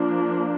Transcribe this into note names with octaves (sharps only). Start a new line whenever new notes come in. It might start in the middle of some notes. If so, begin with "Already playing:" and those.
Already playing: F3 A#3 D4